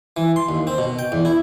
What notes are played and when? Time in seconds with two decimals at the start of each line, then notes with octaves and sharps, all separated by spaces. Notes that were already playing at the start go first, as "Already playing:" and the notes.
0.17 E3
0.36 C6
0.49 D#2
0.67 C4
0.78 B2
0.99 G5
1.12 E2
1.25 E4